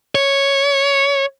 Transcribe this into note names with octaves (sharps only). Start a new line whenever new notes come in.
C#5